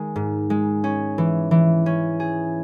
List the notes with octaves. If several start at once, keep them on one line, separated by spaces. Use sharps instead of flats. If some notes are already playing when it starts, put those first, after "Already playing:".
Already playing: D#3 G#3 A#4
G#2
G#3
C#4
E3
E3
C#4
G#4